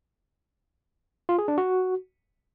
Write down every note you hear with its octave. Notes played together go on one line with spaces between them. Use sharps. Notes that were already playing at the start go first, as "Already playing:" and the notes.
F4
G#4
D4
F#4